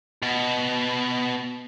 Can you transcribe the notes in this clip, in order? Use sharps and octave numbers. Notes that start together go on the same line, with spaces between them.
B2